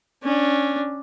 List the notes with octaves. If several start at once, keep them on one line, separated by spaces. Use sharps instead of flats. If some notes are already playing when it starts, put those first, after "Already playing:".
C#4 D4